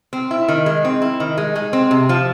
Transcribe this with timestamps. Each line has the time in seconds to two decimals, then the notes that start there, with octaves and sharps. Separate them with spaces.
0.13 C4
0.31 E4
0.49 D#3
0.66 G#3
0.85 C4
1.02 E4
1.20 D#3
1.38 G#3
1.56 G#3
1.73 C4
1.91 C3
2.09 F3